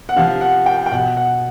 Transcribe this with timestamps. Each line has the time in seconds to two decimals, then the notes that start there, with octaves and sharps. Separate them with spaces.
0.09 F#5
0.16 C3 F3 F5
0.41 F#5
0.66 G5
0.86 G5
0.92 B2 F#5
1.17 F#5